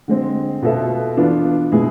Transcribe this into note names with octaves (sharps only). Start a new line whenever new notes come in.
D3 G#3 C4
B2 B3 F4 A4 E5
E3 B3 D4 F4
B2 G#3 B3 E4 G#4